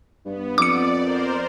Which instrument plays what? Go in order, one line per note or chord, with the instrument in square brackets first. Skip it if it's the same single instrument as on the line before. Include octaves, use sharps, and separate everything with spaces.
[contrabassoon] G2 [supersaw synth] B3
[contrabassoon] F2 [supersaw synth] D5 [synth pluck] D6 C#7
[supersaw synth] A#4 C5